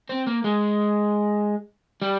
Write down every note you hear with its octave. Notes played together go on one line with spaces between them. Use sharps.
C4
A#3
G#3
G3